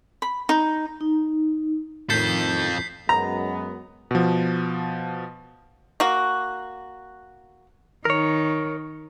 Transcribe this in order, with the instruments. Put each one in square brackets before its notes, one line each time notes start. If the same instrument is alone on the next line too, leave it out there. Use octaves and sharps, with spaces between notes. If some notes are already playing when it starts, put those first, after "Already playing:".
[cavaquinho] B5
D#4
[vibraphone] D#4
[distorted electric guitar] F2 A4 [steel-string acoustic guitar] A2 D#3 [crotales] G6 B6 C7
[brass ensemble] F#2 G#3 B3 [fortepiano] A#5
[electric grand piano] B2 F3
[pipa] A#3 F#4
[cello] D#3 [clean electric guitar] A#4 C#5